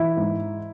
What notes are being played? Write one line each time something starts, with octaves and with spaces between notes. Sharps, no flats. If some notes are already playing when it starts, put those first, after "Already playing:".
Already playing: E3 E4
G#2